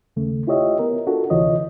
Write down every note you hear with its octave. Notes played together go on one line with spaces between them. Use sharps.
D#2 C#3 A3
E4 F4 G4 C#5 D#5 E5
B3 A#4
D4 F4 F#4 A4
D2 C3 E3 F4 C#5 D#5